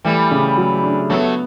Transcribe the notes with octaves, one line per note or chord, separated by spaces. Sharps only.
E3 G3 A3
C#3
F#3
D4
F#3 A3 B3